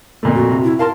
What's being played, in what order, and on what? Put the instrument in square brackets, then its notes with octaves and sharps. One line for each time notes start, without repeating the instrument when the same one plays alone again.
[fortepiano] F2 A#2 A3
[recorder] F#4
[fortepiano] C3
[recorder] E4
[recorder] A#4 [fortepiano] F5 A5 C6